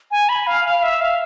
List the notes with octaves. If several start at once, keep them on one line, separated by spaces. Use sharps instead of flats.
G#5
B5
F5
F5
E5
F5